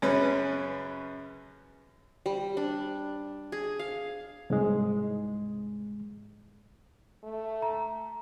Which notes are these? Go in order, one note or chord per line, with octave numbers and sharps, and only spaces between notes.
F#2 C#3 C#4 B4
G3
D4
G#4
F5
C2 G#2 G#3
A3
A#5